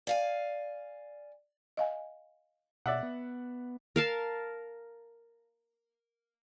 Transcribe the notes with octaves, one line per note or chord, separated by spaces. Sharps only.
D5 F5 G#5
D#5 F5 G#5
B2 D5 E5 F#5
B3
A#4 F5 A5